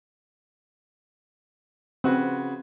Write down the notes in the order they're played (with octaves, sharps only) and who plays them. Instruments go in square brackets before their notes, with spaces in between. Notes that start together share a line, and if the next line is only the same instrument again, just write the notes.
[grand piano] C#3 F#4 B4 [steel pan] C4